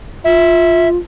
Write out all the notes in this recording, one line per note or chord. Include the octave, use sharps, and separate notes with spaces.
F4 E5